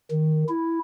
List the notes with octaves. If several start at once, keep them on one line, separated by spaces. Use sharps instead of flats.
D#3
E4